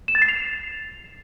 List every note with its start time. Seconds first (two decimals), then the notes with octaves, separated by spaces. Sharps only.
0.08 E7
0.15 A6
0.22 C7
0.29 F7